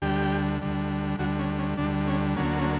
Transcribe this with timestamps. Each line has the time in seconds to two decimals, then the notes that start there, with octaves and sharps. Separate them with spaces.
0.02 D2 D3 G3 G4
0.61 D2 D3 G3
1.19 D2 D3 G3 F#4
1.39 C#4
1.58 C#4
1.77 D2 D3 G3 D4
2.07 C#4
2.36 D2 D3 F#3 A#3 C#4
2.59 C#4